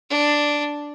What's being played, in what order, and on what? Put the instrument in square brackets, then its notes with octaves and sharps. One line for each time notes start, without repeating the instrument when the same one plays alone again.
[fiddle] D4